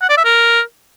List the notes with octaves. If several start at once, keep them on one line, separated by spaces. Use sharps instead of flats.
F#5
D5
E5
A#4